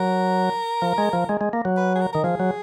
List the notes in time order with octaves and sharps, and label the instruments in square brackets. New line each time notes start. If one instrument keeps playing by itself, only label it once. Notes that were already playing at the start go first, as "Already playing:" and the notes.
Already playing: [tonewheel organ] F#3 [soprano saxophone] A#4
[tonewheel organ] F3
G#3
F3
G#3
G#3
A#3
F#3
[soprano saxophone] B4
G#4
A#4
[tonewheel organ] D#3 [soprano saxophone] A#4
[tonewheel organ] F3 [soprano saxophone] G#4
[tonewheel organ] F#3